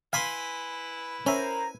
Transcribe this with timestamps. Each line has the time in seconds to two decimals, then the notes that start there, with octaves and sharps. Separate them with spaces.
0.13 E4 B4 F5 G#5 B5 C6
1.26 C#4 A#4 C5 E5 G#5 A#5